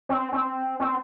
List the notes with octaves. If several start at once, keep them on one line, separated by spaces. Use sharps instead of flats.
C4
C4
C4